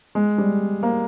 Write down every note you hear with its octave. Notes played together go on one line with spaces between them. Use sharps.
G#3
G3
A#3